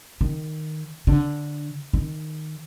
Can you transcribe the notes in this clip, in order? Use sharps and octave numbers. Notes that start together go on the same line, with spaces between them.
D#3
D3
D#3